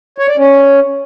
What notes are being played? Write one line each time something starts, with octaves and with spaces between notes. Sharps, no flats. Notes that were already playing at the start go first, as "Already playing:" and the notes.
C#5
D5
C#4